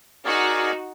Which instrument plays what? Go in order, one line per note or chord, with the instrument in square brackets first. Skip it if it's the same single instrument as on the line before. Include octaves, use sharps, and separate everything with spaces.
[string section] D#4 F#4 [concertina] G#4 A#4 D5